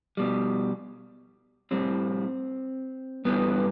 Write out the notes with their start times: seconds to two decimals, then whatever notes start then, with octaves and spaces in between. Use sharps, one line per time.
0.17 B2 G3
1.71 A2 G3 C4
3.25 G2 E3 G3 B3